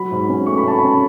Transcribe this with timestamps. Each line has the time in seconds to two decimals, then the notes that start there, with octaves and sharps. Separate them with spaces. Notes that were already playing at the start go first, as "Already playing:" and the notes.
Already playing: F#3 B5
0.11 G#2
0.29 C#4
0.46 A3 C#6
0.58 B5
0.66 C#4 A5
0.79 B5
0.83 C#4